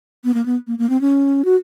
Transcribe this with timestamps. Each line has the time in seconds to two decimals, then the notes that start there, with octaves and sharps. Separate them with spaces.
0.24 B3
0.34 A#3
0.46 B3
0.67 A#3
0.79 A#3
0.90 C4
1.01 C#4
1.45 F#4